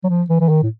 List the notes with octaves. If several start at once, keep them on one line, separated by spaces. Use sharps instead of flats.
F#3
F3
E3
E3
D#3
A2